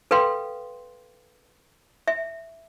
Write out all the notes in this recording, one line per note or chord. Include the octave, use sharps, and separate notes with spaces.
A4 B4 F5 G5 C6
E5